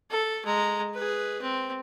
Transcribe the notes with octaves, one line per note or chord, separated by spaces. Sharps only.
A4
G#3 A#5
G#4 B4
C4